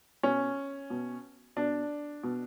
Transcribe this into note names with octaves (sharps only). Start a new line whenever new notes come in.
B2 C#4
B2
B2 D4
B2